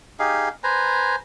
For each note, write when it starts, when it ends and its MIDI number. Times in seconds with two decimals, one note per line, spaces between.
0.19 0.49 63
0.19 0.49 67
0.19 0.49 68
0.19 0.49 77
0.63 1.16 71
0.63 1.16 72
0.63 1.16 80
0.63 1.16 82